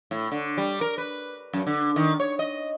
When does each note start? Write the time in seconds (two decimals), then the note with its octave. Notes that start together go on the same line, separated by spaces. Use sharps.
0.11 A2
0.32 D3
0.58 G3
0.81 A#4
0.98 B4
1.53 F#2
1.67 D3
1.96 D#3
2.20 C#5
2.39 D#5